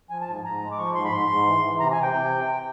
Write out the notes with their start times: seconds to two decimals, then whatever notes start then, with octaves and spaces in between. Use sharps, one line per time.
0.10 F3 G#5
0.21 A5
0.28 G#2
0.44 G#2 A#5
0.61 G#3
0.71 D6
0.78 F3 C#6
0.95 G#2 C6
1.04 B5
1.12 G#2 C6
1.29 G#2
1.46 E3
1.63 E3
1.80 C3 A#5
1.92 G#5
1.97 C3
2.03 G5
2.14 C3